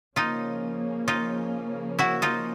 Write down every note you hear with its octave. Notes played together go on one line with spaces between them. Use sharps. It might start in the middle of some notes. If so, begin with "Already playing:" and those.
C#3 F3 A#3 C#4 D#4 F4
D#4 F4
E4 F#4
D#4 F4